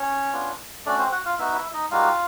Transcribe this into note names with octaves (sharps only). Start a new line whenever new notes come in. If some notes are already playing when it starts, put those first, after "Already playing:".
Already playing: C#4 C#5
B3 D4 F4
A3 C#4 D4 F#4 D5
C4 C5
F#4 F#5
F4 F5
B3 D#4 E4 F#4 E5
E4 E5
D#4 D#5
G3 A#3 D#4 F4 F#4 F5